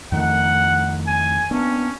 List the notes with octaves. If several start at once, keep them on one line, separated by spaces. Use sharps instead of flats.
F2 D#3 A3 F#5
G#5
A#3 B3 C#4 D4